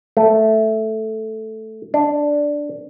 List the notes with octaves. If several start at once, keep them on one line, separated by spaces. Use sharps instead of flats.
A3
D4